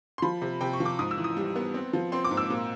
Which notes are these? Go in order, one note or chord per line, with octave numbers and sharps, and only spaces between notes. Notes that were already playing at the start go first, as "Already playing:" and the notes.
C6
F3 B5
C3
C3 G5
C#6
F3
D6
G#2 D#6
E6
E3
D#6
G3
B3
C4
F3
C4 C6
D6
G#2
E6
A#2